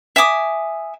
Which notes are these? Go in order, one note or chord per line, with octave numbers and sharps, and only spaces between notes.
E5 G#5 D6 D#6